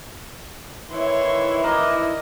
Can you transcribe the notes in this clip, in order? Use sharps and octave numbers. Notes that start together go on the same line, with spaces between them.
D#3 E3 E4 C#5 C6
A#4 D5 D#5